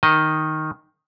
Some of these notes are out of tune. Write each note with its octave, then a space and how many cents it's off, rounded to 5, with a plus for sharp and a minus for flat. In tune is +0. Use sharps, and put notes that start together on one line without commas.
D#3 +0 D#5 +0